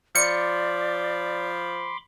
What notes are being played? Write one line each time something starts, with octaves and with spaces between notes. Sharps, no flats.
F3 D5 B5 C6 D6 C#7